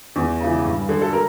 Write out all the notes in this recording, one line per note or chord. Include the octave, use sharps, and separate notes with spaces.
E2
C#3 E3
G2
D3
A4
A#4